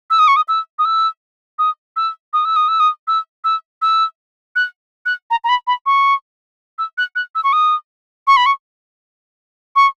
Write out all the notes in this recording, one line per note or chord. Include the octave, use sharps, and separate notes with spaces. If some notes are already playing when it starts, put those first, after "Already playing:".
E6
D#6
C#6
D#6
E6
D#6
E6
D#6
E6
D#6
E6
D#6
E6
D#6
E6
E6
E6
F#6
F#6
A#5
A#5
B5
B5
C#6
E6
F#6
F#6
E6
C#6
D#6
C#6
B5
C#6
C#6